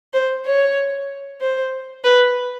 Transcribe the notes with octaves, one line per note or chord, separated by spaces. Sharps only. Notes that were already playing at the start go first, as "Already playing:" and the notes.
C5
C#5
C5
B4